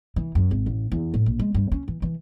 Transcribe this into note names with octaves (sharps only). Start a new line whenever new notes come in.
E3
F#2
G#1
A1
E2
A2
A#1
G#3
G2
C#4
E3
E3